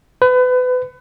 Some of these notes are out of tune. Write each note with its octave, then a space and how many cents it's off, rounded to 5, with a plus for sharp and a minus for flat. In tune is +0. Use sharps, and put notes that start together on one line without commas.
B4 +30